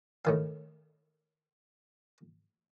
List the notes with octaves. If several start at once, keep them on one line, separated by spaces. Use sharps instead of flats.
A2 D#3 F5